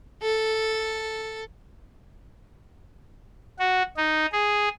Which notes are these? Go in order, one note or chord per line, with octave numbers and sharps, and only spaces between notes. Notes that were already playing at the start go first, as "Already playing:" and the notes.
A4
F#4
D#4
G#4